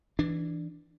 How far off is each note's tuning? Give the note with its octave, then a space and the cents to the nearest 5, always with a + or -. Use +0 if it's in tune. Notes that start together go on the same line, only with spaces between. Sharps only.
E3 +0 D4 +5